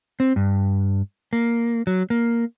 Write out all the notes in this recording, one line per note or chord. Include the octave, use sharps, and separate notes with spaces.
C4
G2
A#3
F#3
A#3